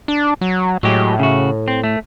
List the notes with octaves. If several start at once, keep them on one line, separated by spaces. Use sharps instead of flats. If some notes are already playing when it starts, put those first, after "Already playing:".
D4
F#3
A2 F#3 G#3 G4
C#3 F#4
C4
A3